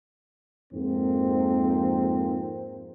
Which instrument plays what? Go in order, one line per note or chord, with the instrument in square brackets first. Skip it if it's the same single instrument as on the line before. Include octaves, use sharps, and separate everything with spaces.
[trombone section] F2 G#2 A#3 C4